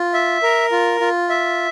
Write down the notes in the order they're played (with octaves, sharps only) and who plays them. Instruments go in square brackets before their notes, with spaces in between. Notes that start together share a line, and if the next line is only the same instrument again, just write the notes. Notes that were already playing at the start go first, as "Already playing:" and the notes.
Already playing: [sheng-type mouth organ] F4
E5
A#4
F4
F4
E5